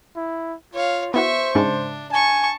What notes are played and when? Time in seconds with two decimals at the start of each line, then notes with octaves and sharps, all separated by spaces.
0.16 E4
0.74 F4 C#5 F5
1.14 B3 E4 F#4 C5 E5 C#6
1.55 G#2 C#3 G#3 D4
2.12 G#5 A5 C#6